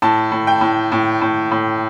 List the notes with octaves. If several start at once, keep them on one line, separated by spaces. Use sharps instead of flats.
A2 A5
A2
G5
A2
A2
A2
A2